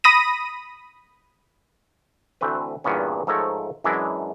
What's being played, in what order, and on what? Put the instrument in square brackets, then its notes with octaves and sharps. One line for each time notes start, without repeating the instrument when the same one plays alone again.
[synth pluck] B5 D#6 A#6 D#7
[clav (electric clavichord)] D2 E3 A3 C4 B4
E2 G2 A#2 B3 C#4
G#2 F3 A3 A4 A#4 C#5
F#2 E3 F#3 G#3 D4 E4